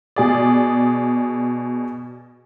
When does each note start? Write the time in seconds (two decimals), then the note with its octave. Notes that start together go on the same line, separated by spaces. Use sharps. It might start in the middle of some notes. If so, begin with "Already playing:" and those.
0.16 B2 G#4 D5